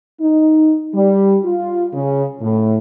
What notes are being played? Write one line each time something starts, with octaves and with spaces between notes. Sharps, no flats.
D#4
G3
F4
C#3
A2